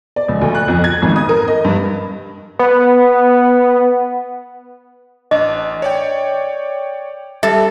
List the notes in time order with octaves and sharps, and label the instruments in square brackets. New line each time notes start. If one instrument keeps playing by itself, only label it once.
[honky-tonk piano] D5
C#2
D2
F#6
F2
G#6
G#1
D#6
A#4
D#5
G2
[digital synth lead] B3
[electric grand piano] A1 D4 [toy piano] D#5
[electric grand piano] C#5 D5 G5
[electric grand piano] G3 [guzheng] A4 [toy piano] E5